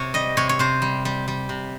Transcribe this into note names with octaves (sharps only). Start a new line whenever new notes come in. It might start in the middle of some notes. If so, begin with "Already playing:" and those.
Already playing: C3 C#5
G3 D#5
C3 C#5
C#5
C3 C5
G3
G3
G3
C3